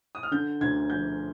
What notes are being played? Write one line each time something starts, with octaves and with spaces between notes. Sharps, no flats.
D#6
F6
D3 G6
D2 G#6
F3 G6